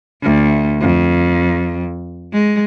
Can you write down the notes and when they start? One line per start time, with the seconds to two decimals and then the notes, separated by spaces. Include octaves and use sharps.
0.23 D2
0.81 F2
2.33 G#3